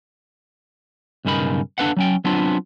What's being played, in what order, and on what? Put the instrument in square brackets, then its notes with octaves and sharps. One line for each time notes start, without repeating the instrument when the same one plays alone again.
[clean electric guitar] B1 G2 C#3 D#4 A#4 B5
D4 A4 B4 F5 F#5
F#3 C#4 G5
F#3 B3 C4 D4 F4